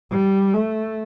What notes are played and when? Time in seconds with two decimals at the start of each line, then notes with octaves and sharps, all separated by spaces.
0.11 G3
0.54 A3